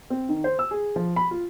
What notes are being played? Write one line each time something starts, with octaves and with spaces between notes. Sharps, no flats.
C4
D#3
C5
E6
G#4
F3
B5
F4